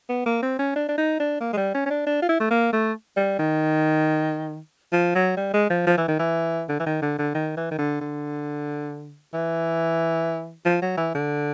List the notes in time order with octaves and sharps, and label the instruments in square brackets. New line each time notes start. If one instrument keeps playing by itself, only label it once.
[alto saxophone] B3
A#3
C4
C#4
D4
D4
D#4
D4
A#3
G#3
G3
C#4
C#4
D4
D4
F4
E4
A3
A#3
A3
G3
D#3
F3
F#3
G3
G#3
F3
F3
E3
D#3
E3
D3
E3
D#3
D3
D3
D#3
E3
D#3
D3
D3
E3
F3
F#3
E3
D3